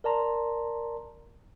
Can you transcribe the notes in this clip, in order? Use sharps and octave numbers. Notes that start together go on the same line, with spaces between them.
A#4 D5 A5 A#5 C6